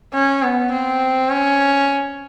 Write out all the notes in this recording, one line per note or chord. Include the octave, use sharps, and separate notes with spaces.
C#4
B3
C4
C#4